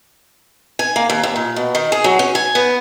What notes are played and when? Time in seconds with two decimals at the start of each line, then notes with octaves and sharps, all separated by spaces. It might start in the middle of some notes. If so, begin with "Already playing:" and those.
0.79 G#5
0.96 A#3
1.10 D#2
1.23 D#2
1.36 A#2
1.56 B2
1.75 D#3
1.92 G#4
2.04 F#3
2.19 C#4
2.35 G#5
2.55 B3